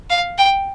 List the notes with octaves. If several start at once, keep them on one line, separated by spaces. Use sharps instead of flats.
F5
G5